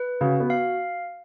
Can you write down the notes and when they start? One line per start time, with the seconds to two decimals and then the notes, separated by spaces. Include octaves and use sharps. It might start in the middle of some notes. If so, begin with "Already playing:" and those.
Already playing: B4
0.21 C#3 F#4
0.40 B3
0.50 F5